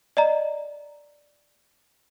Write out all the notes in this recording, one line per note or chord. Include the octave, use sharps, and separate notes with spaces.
D5 D#5 A#5